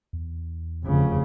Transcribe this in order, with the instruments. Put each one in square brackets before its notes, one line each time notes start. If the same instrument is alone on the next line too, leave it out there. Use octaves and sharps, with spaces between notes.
[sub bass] E2
[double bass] F1 C#3